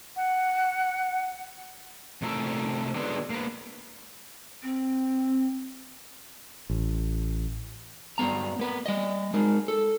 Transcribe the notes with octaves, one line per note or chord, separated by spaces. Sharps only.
F#5
C3 A3 E4 G#4 A#4 E5
D3 F#3 G#3 B3
A#3 B4
C4
A1
G2 F#3 B3 A#5
A#3 B4
G3 D#5
G#3 D#4 A#4
A4